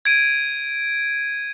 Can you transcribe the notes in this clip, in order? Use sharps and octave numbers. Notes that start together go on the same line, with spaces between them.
G#6 D7 D#7